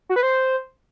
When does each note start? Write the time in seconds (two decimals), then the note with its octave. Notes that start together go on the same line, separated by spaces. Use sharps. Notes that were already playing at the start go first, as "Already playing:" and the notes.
0.09 F#4
0.16 B4
0.23 C5